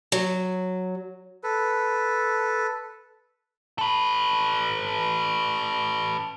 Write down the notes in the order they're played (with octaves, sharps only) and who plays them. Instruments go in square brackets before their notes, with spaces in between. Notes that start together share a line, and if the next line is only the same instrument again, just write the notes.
[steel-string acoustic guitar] F#3
[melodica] A4 B4
[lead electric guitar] A4 B4